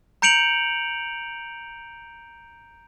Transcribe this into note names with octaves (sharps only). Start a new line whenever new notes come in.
A#5 G6 C#7 D7 F7 F#7